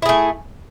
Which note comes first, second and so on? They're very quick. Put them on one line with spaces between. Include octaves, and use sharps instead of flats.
E4 G#4 A3